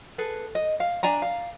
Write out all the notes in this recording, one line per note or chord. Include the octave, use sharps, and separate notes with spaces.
G#4 A4 B4
D#5
F5
D4 D5 G#5 A#5
F5